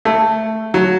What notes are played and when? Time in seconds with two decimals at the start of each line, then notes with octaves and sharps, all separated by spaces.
0.05 A3
0.74 F#3